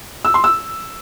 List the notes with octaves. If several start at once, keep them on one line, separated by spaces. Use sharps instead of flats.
E6
C6
E6